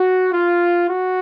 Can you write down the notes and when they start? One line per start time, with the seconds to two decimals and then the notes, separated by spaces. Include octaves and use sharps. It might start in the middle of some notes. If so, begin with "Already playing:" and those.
Already playing: F#4
0.33 F4
0.88 F#4